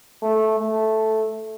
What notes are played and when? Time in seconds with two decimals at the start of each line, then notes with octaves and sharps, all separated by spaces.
0.22 A3
0.60 A3